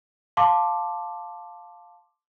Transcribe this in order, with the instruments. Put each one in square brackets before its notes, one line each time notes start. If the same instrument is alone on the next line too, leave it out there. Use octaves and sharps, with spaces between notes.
[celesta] F5 A5 C6 D6